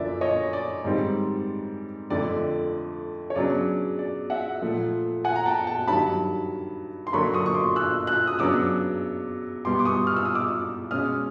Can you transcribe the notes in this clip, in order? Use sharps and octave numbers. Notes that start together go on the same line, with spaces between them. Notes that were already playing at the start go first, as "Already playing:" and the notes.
Already playing: F#2 D3 F3 A#3 D5 E5
C#5 D#5
D5
G#2 D#3 G3 C4
F2 D3 F3 A3 D5
C#5
C#3 F#3 B3 D4 D5
D5
E5 F#5
A#2 F3 A3
F#5 G#5
A#5
G5 A5
G5 A5
G2 D#3 F#3 A5 B5
C6
D3 F#3 A#3 D4 B5 C#6
C#6 D#6
C#6
C6 D6
E6 F#6
E6 F#6
D#6
C#3 F#3 B3 D4 D6 E6
B2 G3 B3 C6 D6
D6
C#6 D#6
F6
E6
D#6
D6 E6
B2 G#3 C#4 D#6 F6